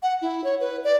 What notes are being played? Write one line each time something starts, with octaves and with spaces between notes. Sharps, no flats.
F#5
E4
C#5
B4
D5